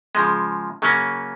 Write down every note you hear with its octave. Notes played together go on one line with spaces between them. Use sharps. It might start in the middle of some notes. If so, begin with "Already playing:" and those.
C#3 F3 G#3
C#3 F#3 A#3 C#4